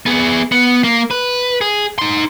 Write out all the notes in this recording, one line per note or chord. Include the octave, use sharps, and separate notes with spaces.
B3 G#4
B3
A#3
B4
G#4
D#4 C6